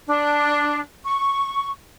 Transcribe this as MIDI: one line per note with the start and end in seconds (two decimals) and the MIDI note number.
0.07 0.80 62
1.05 1.71 85